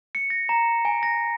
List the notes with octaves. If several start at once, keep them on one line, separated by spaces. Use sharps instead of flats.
C#7
A#6
A#5
G#5
A#6